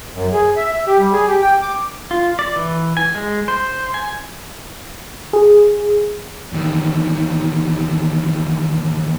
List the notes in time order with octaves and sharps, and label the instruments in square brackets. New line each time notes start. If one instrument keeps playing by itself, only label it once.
[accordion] F#2
G#4
E5
E5
G4
G3
G#4
G4
G5
D6
[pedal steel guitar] F4
D5
E3
G#5
G#3
C5
G#5
[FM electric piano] G#4
[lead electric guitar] E2 D#3